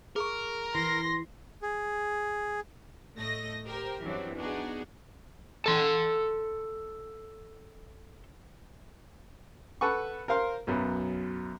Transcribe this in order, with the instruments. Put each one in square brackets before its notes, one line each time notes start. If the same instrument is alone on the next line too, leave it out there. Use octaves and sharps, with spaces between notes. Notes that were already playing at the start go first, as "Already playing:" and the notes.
[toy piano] G#4 C#6 [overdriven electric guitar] A#4
[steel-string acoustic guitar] E3 [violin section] C6 A#6
[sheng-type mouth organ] G#4
[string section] A2 A3 D#5 A#6
G4 A#4 C5 G5
F#2 E3 F#3 G3 C4 D4
B3 D4 D#4 F#4 G#4
[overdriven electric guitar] A4 C6
[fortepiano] A4 B4 F#5 C#6
A#4 C5 F5 C6
B1 F#2 B3